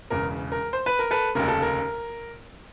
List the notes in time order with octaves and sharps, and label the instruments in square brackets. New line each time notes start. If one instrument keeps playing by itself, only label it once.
[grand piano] E1 E2 C#3 A#4
A#4
C5
B4
A#4
A4 B4
F1 D#2 C#3 A#4
A4
A#4